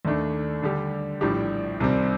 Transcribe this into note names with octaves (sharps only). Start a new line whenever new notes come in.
D#2 D#3 A3 D4
D3 G3 D4 G4
A#1 A2 G3 D4 G4
C2 C3 D#3 G3 C4